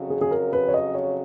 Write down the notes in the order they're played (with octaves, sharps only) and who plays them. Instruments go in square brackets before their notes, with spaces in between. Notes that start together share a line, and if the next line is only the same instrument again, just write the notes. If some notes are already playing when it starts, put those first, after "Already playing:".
Already playing: [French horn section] F2 C#3 F#3
[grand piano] G#4
G#4
A#4
B4
C#5
D#5
C#5